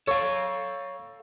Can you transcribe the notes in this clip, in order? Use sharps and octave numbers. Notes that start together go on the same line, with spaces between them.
A4 C#5 F5